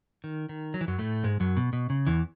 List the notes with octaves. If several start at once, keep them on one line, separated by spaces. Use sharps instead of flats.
D#3
D#3
F#3
E3
F#2 F#3
A2 A3
G#2 G#3
F#2 F#3
B2
B2
C#3
E2 E3